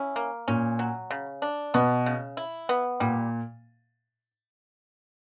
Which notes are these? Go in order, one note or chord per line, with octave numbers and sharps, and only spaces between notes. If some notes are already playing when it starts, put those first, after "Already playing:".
Already playing: C#4 E4
A#3
A#2 C#4
F#3
C#3
D4
B2 B3
C#3
E4
B3
A#2 G3